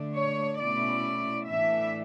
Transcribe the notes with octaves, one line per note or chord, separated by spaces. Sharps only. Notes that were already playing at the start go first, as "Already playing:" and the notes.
Already playing: D3 A3 D4
C#5
B2 A3 C#4 E4 D5
A2 E3 A3 D4 E5